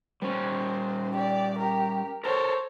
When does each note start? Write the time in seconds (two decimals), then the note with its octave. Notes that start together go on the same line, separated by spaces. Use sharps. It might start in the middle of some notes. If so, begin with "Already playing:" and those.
0.22 G3 C#4 C5
1.13 G4 D5
1.58 G4 A#4
2.24 A4 A#4 C5 C#5